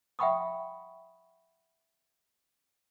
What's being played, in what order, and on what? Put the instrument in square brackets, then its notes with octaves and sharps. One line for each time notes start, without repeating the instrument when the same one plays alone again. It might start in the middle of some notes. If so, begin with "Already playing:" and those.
[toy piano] E5 F#5 G5 B5 C#6 D#6